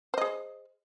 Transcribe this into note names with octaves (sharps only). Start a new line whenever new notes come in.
G#4 C5 D#5